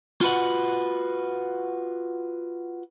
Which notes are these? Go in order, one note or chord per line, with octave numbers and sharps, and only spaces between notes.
F4 F#4 B4 F#5